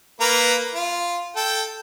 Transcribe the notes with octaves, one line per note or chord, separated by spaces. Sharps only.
A#3 B4 A#5
F4
A4 G5